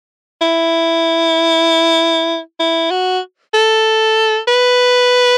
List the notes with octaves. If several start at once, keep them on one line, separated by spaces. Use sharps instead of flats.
E4
E4
F#4
A4
B4